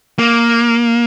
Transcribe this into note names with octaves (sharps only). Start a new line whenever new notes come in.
A#3